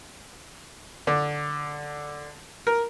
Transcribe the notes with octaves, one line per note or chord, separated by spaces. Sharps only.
D3
A#4